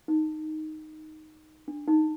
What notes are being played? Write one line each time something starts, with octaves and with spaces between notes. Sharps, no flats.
D#4
D4
D#4